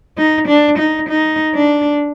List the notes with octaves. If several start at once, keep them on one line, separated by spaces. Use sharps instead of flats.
D#4
D4
D#4
D#4
D4